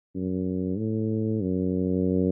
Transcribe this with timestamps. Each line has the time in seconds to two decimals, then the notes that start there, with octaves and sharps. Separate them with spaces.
0.15 F#2
0.78 A2
1.41 F#2